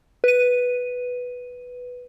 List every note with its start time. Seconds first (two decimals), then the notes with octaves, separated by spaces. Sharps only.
0.24 B4 D#7